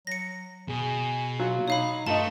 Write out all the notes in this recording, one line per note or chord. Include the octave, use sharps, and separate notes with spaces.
F#3 A#6 C#7
B2 G#4
F#3 F4
D#4 C#5 F5 B5
G2 A3 F4 D#5 A5